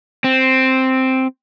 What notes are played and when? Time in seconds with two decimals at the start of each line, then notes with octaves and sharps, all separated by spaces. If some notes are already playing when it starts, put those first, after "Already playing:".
0.24 C4